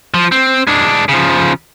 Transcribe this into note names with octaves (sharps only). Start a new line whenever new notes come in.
F3
C4
G#3 D4
C#3 F3